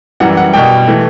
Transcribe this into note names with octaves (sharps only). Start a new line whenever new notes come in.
F#2 E3 G3 F#5
F#5
B2 G3 G5
E3 A3